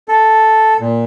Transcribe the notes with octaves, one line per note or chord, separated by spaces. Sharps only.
A4
A#2